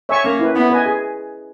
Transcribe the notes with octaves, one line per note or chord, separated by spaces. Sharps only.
C#5 E5 G#5 C#6
A#3 C#4
E4 B4
B3 E4
B4 D#5 G#5
G#4